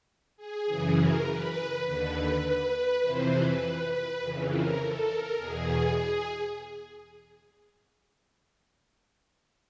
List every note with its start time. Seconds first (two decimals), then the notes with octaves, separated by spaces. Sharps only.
0.37 G#4
0.66 F#2 C#3 E3
0.96 A#4
1.25 B4
1.84 D#2 D3 B4
2.43 B4
3.02 F2 C3 E3 C5
3.32 B4
3.91 B4
4.19 F2 C#3 E3
4.49 A#4
4.79 A4
5.08 A#4
5.38 E2 B2 G#4
5.96 G#4